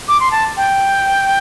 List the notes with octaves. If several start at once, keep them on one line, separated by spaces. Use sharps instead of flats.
D6
C6
A5
G5